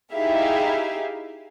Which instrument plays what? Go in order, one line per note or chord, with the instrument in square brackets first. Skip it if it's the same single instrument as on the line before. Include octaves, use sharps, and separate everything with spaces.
[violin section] D#4 E4 G4 G#4 E5 F5